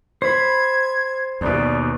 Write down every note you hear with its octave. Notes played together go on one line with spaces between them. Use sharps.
C5 B5 G#6
D#2 B2 D5